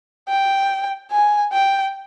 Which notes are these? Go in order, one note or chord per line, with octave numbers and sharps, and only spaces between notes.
G5
G#5
G5